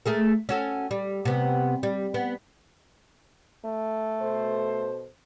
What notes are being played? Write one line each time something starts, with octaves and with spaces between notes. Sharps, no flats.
A3 G#4 A#4
C#4 F#4 A4
G3
C3 B3
G3
B3
A3
B2 A4 C5